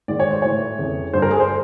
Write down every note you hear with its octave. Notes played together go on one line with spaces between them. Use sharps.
G#2 D#3 D5
C#5
C5
A2 E3 C#5
F2 C#3 E3
G2 D3 C5
A#4
G#4
C5